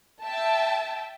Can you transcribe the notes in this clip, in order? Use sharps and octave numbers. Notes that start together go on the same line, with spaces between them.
E5 G5 A5